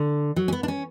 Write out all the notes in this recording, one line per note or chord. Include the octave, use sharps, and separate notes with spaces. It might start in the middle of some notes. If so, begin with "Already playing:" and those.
Already playing: D3
F#3
C#4
B3
D4
C#4